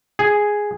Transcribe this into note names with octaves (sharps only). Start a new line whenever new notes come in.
G#4